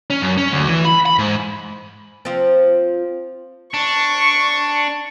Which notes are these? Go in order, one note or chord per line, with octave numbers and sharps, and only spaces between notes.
C#4
F#2
C#4
D2
E3
B5
B5
G#2
F3 C4
D4 C#6